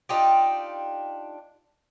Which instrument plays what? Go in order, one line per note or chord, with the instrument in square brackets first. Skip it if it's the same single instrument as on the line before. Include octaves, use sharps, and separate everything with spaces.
[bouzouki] D4 D#4 F4 G4